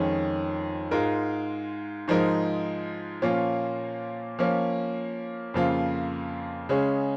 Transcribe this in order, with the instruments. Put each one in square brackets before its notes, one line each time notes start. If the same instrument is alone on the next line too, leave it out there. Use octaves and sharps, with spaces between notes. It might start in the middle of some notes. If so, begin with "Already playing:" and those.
Already playing: [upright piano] F2 D#3 G#3 C#4
G#2 G#3 F4 A#4
G#2 F3 G#3 D#4 A#4
A#2 F3 A#3 C#4 F4
F3 A#3 C#4
F2 C#3 F3 A#3 F4
C#3 G#3 C#4 G#4